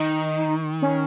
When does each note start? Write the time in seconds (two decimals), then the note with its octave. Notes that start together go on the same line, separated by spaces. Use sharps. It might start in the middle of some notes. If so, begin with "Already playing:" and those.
Already playing: D#3 D#4
0.82 C#4